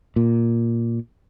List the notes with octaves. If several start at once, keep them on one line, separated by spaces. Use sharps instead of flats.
A#2